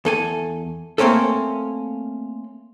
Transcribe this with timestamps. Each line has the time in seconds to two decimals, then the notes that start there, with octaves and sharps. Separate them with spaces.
0.05 E2 A4 G#5
0.98 A3 A#3 C4 C#4 A4